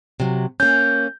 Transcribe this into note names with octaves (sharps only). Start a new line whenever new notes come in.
C3 F#3
A#3 C#4 G6